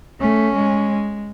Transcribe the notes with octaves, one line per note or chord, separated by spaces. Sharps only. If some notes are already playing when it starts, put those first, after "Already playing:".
A3 C#4
G#3